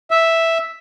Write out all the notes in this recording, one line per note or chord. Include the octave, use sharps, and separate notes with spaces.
E5